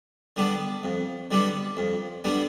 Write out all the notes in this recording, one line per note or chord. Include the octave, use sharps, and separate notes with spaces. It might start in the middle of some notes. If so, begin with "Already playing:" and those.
D3 G3 B3 D4
F2
D3 G3 B3 D4
F2
D3 G3 B3 D4